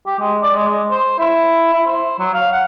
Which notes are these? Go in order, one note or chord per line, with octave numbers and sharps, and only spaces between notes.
G4
G#3
D5
G#3
G#3
C5
E4
E4
C5
F#3
F5
F#5